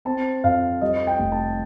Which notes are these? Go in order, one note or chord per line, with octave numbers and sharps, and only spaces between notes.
C4 A5
F2 F5
G3 D#5
G5
F1
A5